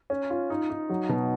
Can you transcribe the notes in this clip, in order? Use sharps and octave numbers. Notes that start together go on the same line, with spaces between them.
C#4
F4
D#4
D#4
F#3
B2